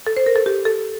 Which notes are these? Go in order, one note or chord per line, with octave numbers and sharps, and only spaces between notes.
A4
C5
A#4
A4
G4
A4